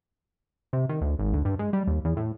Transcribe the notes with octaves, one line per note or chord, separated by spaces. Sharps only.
C3
D#3
D2
G#1
D2
G2
G#3
G3
D#2
E2
A2